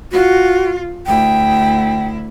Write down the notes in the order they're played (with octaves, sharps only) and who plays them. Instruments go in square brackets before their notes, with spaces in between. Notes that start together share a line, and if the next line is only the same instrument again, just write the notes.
[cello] F4 [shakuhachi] F#4
[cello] D2 E4 [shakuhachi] G5